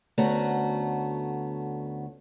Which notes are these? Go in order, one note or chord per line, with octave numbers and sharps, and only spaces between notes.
D2 A3 B3 C#4 F#4 A#5